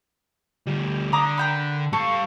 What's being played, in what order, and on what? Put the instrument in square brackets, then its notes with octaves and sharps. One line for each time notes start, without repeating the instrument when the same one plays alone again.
[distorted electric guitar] D2 G3
[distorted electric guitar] D3 [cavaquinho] A#5 D6 D#6
[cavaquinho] A#4 G5 B5
[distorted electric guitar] G3 F5 [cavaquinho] A4 C#6